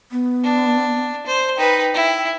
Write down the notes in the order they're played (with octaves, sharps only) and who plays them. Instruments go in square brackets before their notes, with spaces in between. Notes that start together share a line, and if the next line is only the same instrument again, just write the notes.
[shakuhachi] B3
[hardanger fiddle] D4
C5
[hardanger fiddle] D#4 B4 [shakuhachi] G5
[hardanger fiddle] E4